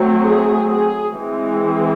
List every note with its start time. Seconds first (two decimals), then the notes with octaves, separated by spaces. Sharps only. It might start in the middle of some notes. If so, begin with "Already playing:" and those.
Already playing: F#3 A3 C4
0.25 G#4
0.69 G#4
1.14 E3 G#3 C4